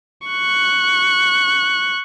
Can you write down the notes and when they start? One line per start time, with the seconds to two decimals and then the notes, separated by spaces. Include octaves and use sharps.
0.28 C#6 F#6